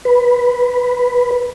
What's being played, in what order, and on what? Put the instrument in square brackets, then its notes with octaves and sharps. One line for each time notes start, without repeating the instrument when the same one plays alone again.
[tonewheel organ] B4